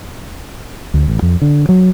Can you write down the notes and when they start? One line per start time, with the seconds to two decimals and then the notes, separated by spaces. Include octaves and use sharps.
0.94 D2
1.08 A1
1.22 F2
1.42 D3
1.69 F#3